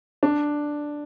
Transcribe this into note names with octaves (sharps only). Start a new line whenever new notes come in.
D4